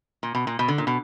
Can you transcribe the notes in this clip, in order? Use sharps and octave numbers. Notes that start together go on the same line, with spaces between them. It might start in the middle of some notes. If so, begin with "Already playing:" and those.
A#2
B2
A#2
B2
D3
A#2
B2